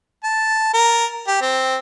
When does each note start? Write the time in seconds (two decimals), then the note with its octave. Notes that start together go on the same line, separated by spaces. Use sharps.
0.24 A5
0.74 A#4
1.28 G4
1.41 C4